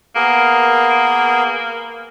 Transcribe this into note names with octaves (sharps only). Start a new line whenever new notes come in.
A#3 B3 G#4 A#4